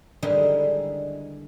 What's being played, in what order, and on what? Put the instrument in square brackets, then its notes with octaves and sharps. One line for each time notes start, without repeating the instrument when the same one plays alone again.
[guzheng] D3 D#3 G3 G#3 D#4 E4